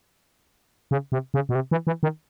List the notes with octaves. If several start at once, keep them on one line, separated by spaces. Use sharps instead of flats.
C#3
C3
C#3
B2
C3
E3
E3
D#3